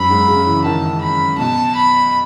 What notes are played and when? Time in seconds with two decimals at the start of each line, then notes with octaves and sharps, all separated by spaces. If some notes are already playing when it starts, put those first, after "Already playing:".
Already playing: F#2 B5
0.10 G#2
0.28 C#3
0.47 E3
0.65 D#3 A5
1.01 B5
1.39 B2 A5
1.75 B5